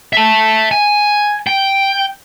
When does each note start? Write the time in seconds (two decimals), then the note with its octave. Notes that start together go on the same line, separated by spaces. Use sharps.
0.13 E5 A5
0.71 G#5
1.47 G5